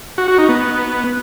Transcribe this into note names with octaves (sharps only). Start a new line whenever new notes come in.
F#4
F#4
D#4
B3